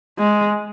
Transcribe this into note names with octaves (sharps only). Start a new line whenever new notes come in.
G#3